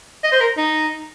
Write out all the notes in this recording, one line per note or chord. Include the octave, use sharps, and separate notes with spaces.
D#5
C5
A#4
D#4